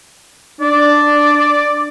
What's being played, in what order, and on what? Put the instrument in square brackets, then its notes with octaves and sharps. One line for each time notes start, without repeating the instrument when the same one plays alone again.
[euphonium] D4 [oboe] D5